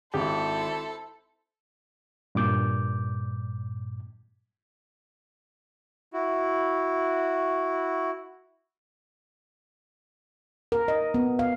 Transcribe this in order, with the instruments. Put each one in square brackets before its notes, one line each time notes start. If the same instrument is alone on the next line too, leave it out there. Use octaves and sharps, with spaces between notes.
[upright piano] G#1 [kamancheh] E4 C5 [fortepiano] G4 [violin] A4
[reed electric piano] G2 A#2 D6 G6
[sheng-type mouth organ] E4 F#4
[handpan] A#4
D#5
B3
F5